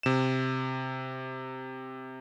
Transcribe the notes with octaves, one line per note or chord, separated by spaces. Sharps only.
C3 E7